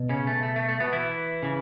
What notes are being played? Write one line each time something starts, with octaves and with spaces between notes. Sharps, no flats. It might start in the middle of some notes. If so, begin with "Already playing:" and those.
Already playing: B2
C#3 C#4
A3
A3
A3
A3
B2 B3
E3 E4
C#3 E3